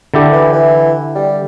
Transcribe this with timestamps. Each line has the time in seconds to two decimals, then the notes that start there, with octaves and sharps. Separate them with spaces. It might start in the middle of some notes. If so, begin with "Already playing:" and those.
0.14 D3 E4 G4
0.32 E3
0.53 E3
1.15 G3